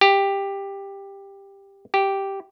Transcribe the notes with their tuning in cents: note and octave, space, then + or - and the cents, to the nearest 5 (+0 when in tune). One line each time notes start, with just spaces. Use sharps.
G4 +10
G4 -5